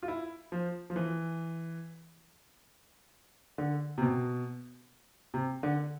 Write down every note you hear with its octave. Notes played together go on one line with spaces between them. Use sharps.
F4
E4
F3
F3
E3
D3
C3
B2
C3
D3